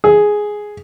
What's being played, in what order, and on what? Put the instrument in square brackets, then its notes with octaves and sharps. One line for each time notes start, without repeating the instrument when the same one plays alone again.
[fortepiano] G#4